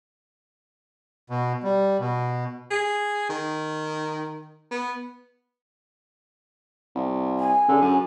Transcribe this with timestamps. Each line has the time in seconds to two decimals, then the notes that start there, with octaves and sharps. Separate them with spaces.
1.30 B2
1.63 G3
1.99 B2
2.70 G#4
3.29 D#3
4.71 B3
6.95 C2
7.39 G#5
7.69 D3 C#4 G#4
7.82 F#2